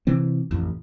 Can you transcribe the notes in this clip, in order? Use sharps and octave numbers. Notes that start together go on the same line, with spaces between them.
C3 E3 C4
A1 F2